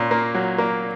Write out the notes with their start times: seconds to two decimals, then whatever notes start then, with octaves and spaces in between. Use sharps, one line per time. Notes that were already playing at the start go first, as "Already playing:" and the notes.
Already playing: A#2 C#4
0.11 A#3
0.35 F#3
0.58 A#3